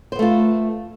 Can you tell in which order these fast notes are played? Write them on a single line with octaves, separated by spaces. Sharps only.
C5 B3 A3 F4